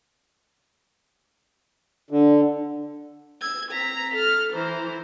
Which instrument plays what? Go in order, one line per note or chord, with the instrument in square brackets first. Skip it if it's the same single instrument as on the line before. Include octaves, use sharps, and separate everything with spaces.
[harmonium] D3
[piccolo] E6 [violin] G#6
[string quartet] C4 [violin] A#5 [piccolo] B6
[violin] A4 [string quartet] F6 [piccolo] F7
[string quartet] E3 [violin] C5 [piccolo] A#5